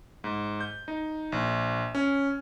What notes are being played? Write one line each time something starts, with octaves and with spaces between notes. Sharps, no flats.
G#2
G6
D#4
A#1
C#4